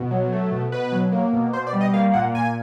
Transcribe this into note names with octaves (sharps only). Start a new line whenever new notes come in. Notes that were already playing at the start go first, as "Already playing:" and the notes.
Already playing: B2
F#3
A3
B2
B2 B4
F#3
A#3
B2
B2 C5
D5
G3
D#5
A#3 F5
A#2 F#5
A#2 G#5